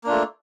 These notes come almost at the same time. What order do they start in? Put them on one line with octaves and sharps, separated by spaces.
A#3 D4 F4 A3